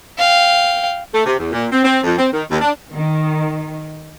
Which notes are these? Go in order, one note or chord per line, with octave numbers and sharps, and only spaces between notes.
F5 G5
A3
C3
E2
A#2
C4
C4
F2
C4
D#3
D#2
D4
D#3